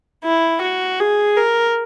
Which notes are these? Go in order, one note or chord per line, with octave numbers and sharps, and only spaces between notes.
E4
F#4
G#4
A#4